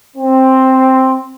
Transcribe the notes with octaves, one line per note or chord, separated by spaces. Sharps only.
C4